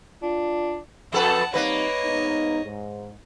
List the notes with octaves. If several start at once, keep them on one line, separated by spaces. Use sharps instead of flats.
D4 F4
F2 A4 B4 F#5 A5
G3 A#3 C4 D#4 B4 C#5 D#5
G#2 B3 D#4
G#2